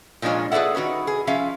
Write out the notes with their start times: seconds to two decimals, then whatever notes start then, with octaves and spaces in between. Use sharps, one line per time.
0.22 A#2 F3 G#3 D4 F4 C#5
0.52 G#4 A4 B4 D5 E5 F#5
0.75 D#3 F#4 B4 C#5
1.07 G#4
1.27 F3 C#4 E5 F5